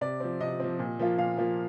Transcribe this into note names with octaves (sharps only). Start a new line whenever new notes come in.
C3 D5
F3 C4
C3 D#5
F3 C4
A#2
F3 A#3 F4
A#2 F5
F3 A#3 F4